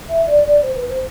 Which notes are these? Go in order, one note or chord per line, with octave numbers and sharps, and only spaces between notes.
E5
D5
D5
C5
B4
C5